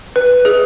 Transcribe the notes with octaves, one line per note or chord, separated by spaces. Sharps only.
B4
G#4